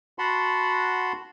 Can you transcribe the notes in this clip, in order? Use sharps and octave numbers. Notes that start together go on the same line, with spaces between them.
F#4 F#5 A5 B5 C6